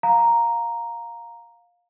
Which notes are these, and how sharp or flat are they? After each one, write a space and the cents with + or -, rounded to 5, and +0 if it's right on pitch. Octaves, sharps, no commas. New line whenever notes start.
F5 +15 A#5 +0